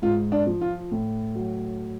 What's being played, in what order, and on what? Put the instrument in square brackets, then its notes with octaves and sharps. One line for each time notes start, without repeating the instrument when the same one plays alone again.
[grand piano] G#2 F4
D4
F3
F4
A2
F#3